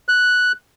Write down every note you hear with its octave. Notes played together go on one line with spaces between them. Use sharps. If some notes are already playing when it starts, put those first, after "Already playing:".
F#6